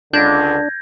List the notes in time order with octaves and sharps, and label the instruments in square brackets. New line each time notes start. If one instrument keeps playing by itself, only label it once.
[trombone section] C#2 D3 [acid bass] D4 [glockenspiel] G6 G#6 A#6